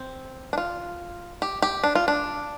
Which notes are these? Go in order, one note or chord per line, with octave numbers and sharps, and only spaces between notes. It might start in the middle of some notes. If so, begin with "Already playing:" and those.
Already playing: C4
D4
F4
G4
G4
D4
F4
D4